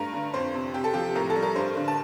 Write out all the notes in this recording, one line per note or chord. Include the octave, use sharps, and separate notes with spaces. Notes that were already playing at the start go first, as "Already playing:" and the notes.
Already playing: G2 A3 A#5
D3
F2 C5
C3
C3 G4
A4
F3 G4
A2 A#4
A4
G3
A#4
G2 C5
D3
A5